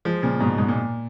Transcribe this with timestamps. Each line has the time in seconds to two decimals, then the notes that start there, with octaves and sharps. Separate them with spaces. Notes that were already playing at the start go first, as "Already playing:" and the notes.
0.05 F3 G#3
0.22 A#2 C#3
0.40 G#2 B2
0.58 G#2
0.68 A#2